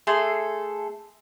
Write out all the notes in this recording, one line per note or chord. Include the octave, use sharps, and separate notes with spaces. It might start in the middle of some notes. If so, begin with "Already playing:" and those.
A3 G#4 A4 C6